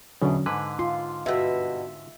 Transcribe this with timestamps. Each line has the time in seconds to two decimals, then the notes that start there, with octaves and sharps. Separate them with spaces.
0.22 E2 B2 D3 F#3 C#4
0.46 G#2 D3 B4 G#5
0.79 F4 C6
1.26 G2 B2 E5